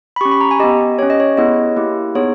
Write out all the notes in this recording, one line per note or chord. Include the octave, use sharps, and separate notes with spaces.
B5
C#4 G4 C#6
B5
A#5
G#5
B3 G4 D#5
C#4 G4 C#5
D#5
C#5
B3 E4 G#4 D#5
A#3 E4 G4
B3 D#4 G#4 C#5